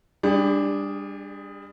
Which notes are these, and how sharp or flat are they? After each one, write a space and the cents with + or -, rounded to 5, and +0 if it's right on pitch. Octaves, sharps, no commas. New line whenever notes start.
G3 +30 D4 +0 G#4 +0